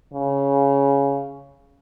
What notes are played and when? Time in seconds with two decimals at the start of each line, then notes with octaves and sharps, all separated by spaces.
0.13 C#3